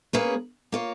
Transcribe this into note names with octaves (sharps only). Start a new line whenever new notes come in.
A#3 C#4 G#4 B4
A#3 F4 A#4 C#5